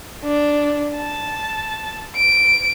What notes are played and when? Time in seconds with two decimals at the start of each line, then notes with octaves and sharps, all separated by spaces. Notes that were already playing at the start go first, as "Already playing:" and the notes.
0.24 D4
0.96 A5
2.16 D7